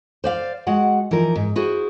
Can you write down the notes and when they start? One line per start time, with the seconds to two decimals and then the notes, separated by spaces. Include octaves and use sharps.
0.24 C5 D5 F5
0.67 G#3 F#4 F#5
1.11 E3 F3 D#4 A#4
1.36 G#2
1.56 E4 F#4 G#4 C5